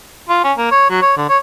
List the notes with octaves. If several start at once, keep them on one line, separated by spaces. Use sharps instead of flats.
F4
C#4
A#3
C#5
F#3
C#5
D3
C#5